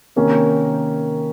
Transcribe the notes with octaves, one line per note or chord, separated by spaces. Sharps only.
C3 D#3 A#3 C#4